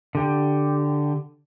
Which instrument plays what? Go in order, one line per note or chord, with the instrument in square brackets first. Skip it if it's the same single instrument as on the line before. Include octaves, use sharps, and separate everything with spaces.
[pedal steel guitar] D3 G4